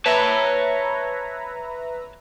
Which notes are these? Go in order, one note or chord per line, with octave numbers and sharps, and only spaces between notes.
B4 C#5 E5 A5 A#5